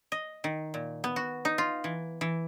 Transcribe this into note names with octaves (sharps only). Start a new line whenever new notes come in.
D#5
D#3
A#2
B3
F#4
D#4
F4
E3
E3